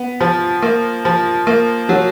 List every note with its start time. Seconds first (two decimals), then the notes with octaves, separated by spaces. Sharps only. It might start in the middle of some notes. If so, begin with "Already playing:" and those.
Already playing: B3
0.21 F3
0.62 A#3
1.05 F3
1.47 A#3
1.89 F#3